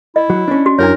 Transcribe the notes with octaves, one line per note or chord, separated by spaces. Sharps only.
E4 D#5
F#3
C#4 D4
F#4
F#2 D4 E4 A#4 C#5